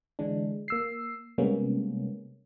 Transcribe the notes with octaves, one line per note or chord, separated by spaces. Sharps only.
D3 E3 G#3 D4
A#3 E6 C7
C3 G3 G#3 A#3 B3 C#4